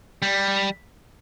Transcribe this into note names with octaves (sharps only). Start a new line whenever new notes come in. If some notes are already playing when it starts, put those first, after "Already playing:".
G3